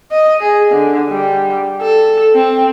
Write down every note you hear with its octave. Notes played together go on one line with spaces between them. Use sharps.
D#5
G#4
D3
G3
A4
C4